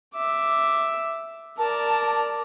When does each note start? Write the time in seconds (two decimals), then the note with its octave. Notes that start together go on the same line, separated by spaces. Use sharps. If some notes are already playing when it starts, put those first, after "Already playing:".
0.15 E5 D6
1.58 A#4 D5 A5